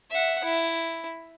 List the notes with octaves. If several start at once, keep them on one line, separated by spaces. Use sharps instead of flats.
E5 F#5
E4